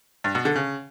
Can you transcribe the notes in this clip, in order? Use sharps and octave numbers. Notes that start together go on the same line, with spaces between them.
G2
B2
D3
C#3